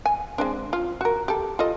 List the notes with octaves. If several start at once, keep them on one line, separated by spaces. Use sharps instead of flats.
G#5
G#3 C4 D4
F4
F#4 A#4
G4 A4
F4 A4 D#5